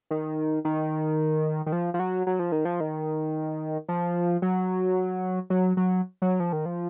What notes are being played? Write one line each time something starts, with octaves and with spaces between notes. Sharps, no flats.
D#3
D#3
D#3
F3
F3
F#3
F#3
F3
D#3
F3
D#3
F3
F#3
F#3
F#3
F#3
F3
D#3
F3